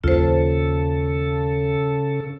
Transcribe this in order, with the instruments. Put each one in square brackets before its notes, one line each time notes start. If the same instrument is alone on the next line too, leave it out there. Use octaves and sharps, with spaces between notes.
[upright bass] D#2 F3 [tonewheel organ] C#3 A4 [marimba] F4 C5